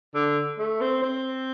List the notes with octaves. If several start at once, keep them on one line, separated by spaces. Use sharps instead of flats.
D3
A3
C4
C4